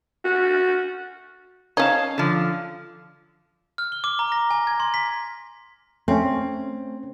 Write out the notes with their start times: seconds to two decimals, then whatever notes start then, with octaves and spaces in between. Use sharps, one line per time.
0.24 F#4
1.77 C#4 D#4 C#5 F5 A5
2.18 D3 F3
3.78 F6
3.92 G7
4.04 D6
4.19 A#5
4.32 A#6
4.51 G#5
4.67 G#6
4.80 C6
4.94 B6
6.08 A3 C4 C#4